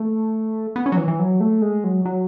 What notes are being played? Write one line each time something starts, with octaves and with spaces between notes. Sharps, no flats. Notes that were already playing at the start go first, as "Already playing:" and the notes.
Already playing: A3
B3
C#4
F#3
E3
E3
F#3
A3
G#3
F#3
F#3